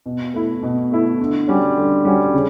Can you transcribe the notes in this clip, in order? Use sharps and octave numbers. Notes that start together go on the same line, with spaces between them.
B2
A3 E4
B2
A3 E4
D3
G3 C#4 F#4
D3
G3 C#4 F#4
C#3